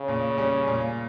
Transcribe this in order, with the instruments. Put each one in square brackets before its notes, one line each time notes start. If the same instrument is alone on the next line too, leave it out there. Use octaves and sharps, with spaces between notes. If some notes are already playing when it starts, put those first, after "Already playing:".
Already playing: [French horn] C#3
[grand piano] A#2
G3 C#4
A#2